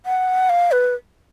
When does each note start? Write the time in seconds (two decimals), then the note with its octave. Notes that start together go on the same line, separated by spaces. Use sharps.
0.06 F#5
0.50 F5
0.72 B4